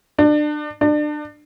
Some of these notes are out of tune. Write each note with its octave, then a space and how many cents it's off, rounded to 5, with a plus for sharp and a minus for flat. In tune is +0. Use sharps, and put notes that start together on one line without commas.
D4 +30
D4 +30